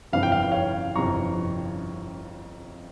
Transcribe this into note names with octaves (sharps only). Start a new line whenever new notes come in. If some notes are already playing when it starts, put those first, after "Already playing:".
G1 F2 C3 E3 G3 F5
G5
F5
G5
C#5 F5
G1 F2 C3 E3 G3 A#5 C#6